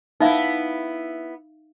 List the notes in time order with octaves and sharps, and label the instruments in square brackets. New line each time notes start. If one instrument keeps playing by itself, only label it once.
[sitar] B3 E4 [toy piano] D#4 E5 F5